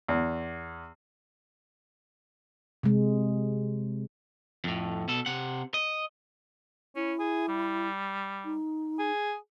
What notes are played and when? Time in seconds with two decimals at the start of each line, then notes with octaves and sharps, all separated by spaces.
0.08 E2
2.83 C3 G#3
4.64 F2 A2
5.08 B2 A4
5.26 C3 F#5
5.74 D#5
6.96 C#4 E4
7.19 G#4
7.48 G3
8.45 D#4
8.99 G#4